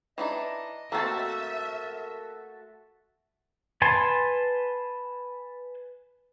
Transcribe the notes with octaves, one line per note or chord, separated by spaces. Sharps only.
E3 D4 D#4 D#5
A3 A#3 C4 F#4 E5 A5
A#4
B4 G#5 A5 C6